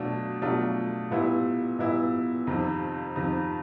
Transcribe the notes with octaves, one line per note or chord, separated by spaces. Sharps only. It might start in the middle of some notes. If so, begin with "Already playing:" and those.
Already playing: B2 F#3 A3 D4 F4
B2 F#3 A3 D4 F4
A#2 G3 B3 E4
A#2 G3 B3 E4
F2 C3 D#3
F2 C3 D#3